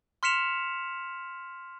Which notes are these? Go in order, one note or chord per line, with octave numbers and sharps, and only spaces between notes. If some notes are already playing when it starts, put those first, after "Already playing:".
C6 F6 B6 C#7 E7 F7